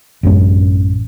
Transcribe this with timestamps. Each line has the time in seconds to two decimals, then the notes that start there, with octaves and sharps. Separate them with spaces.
0.23 A1 F#2 G#3 C#4